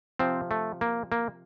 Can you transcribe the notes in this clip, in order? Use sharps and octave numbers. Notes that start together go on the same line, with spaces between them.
C3 F3 C4
A3
A#3
A#3